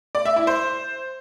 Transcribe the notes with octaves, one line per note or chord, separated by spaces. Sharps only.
D5
E5
E4
C5